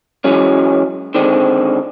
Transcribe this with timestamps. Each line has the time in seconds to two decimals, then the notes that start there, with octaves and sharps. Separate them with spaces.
0.24 E3 F#3 G#3 C#4
1.14 D3 D#3 G#3 C4 D4